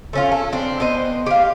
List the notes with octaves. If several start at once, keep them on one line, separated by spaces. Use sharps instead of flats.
A3 C#4 F4
A4
C4 D4
B3 C5 D#5
G4 F5